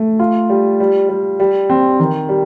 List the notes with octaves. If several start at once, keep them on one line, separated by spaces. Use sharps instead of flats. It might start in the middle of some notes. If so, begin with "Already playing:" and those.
Already playing: A3
F4
G3
G3
G3
G3
C4
D#3
G3